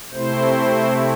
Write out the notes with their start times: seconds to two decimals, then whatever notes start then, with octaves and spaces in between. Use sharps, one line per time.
0.12 C3 A3 C4 E4 C5